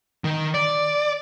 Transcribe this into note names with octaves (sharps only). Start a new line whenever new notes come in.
D#3
D5